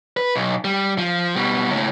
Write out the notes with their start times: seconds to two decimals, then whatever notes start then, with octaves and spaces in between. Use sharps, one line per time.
0.17 B4
0.35 B1
0.65 G3
0.98 F3
1.36 B2 G3
1.70 C#2 A2